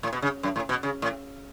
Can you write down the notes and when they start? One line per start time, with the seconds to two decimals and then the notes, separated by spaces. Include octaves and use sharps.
0.03 A2
0.13 B2
0.22 C#3
0.43 F#2
0.56 A2
0.69 B2
0.83 C#3
1.02 A2